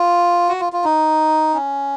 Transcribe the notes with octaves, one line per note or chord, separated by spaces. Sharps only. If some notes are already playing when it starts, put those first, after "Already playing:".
Already playing: F4
F#4
F4
F4
D#4
C#4